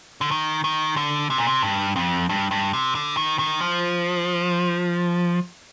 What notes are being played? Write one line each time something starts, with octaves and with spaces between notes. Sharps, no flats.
D3
D#3
D#3
D3
C3
A#2
C3
G2
F2
G2
G2
C3
D3
D#3
D#3
F3